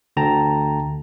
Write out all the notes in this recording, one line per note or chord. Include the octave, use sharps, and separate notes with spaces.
D2 D3 G5 A5 A#5